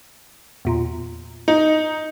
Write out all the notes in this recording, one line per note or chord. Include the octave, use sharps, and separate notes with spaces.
E2 A#2
D#4